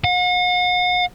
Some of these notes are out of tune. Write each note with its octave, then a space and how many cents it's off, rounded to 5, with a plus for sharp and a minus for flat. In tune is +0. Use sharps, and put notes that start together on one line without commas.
F#5 -45